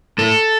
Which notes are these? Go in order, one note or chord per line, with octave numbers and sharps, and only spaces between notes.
A2 A4